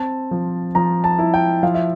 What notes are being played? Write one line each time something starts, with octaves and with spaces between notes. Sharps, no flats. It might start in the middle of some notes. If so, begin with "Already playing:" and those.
Already playing: C4 A5
F3
F3 A#5
A5
E4
G5
F3 F5
E5